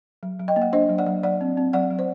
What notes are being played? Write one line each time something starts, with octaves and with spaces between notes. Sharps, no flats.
F#3
F#3
D#5 G5
A#3
F#5
D4 C5 D#5
F#3
D5 F#5
F#3
F#3 D5 F#5
C4
C4
F#3 D5 F#5
F#3
C5